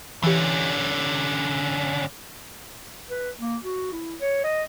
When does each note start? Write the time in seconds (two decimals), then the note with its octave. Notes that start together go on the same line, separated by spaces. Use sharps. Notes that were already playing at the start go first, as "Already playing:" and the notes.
0.23 D3 E3 C#4 G4
3.10 B4
3.39 A#3
3.62 F#4
3.92 E4
4.21 C#5
4.44 D#5